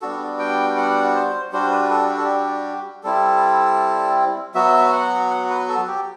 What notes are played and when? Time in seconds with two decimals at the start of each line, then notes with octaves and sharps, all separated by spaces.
0.02 G3 B3 D4 F#4 A4
0.39 G5
0.70 G5
0.77 F#5
1.15 C5
1.52 G3 D4 F#4 C5
1.71 B4
1.82 B4
1.91 A4
2.10 G4
2.17 A4
2.24 G4
3.03 G3 C4 E4 A4
4.55 F#3 B3 F#4 E5
4.93 F#5
5.30 F#5
5.49 B4
5.68 A4
5.87 G4